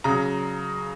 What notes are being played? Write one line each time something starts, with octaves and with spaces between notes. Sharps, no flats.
C#3 F#3 A#5